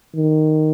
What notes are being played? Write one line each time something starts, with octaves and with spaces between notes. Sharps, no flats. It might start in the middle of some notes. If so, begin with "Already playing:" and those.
D#3